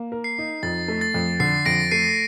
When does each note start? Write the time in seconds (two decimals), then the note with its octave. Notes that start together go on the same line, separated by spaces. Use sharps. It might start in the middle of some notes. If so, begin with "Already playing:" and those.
Already playing: A#3
0.12 A#4
0.24 C7
0.38 D#4
0.63 F2 A6
0.88 A3
1.01 A6
1.14 F2
1.40 D3 C7
1.66 F2 A#6 D7
1.91 A3 C7 D#7